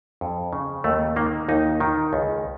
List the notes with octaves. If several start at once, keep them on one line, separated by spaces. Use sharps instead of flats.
F2
C#3
D#2 A3
D#3 A#3
D#2 D#4
D#3
C#2